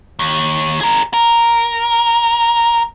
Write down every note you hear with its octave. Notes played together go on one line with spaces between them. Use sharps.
D#2
G#4 A#4
A#4